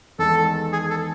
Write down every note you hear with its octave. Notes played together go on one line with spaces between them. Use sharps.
E2 D#3 G#3 A4
G#4
A4